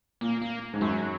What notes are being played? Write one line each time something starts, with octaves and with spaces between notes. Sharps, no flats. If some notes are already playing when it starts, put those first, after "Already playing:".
A#2 A#3
A#3
G#2
F#2 F#3